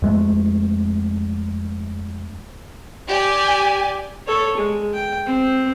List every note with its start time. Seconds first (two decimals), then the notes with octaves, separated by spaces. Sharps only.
0.02 F2 G#3 A3
3.07 G4 D5 G#5
4.27 A4 C#5
4.57 G#3
4.94 G5
5.26 C4